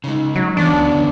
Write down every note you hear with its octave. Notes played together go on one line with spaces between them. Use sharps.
C#3 G#3 D#4
F#3
F#2 E3 B3 C#4 D4
D2
D3